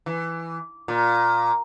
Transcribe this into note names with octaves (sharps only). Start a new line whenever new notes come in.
E3
A#2